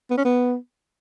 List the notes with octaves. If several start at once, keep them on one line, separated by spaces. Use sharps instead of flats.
B3
C#4
B3